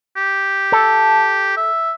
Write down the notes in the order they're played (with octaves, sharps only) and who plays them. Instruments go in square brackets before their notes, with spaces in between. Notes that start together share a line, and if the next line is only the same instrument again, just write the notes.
[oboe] G4
[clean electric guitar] A4
[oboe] E5